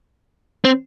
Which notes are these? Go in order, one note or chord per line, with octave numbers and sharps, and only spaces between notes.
C4